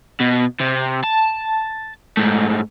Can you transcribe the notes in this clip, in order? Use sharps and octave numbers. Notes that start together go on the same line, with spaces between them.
B2
C3
A5
G#2 A3